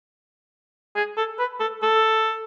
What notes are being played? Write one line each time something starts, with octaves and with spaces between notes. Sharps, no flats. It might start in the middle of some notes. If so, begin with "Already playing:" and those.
G#4
A4
B4
A4
A4